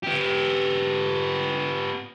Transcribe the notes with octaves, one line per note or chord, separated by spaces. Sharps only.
B3 G4